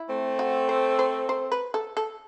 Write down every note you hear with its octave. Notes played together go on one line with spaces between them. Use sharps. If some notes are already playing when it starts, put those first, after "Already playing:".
Already playing: E4
A3 C4
F#4
C5
C5
C5
B4
A4
A4